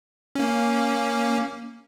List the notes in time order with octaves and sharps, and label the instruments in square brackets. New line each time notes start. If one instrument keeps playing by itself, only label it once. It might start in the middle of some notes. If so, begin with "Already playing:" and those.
[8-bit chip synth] A#3 C#4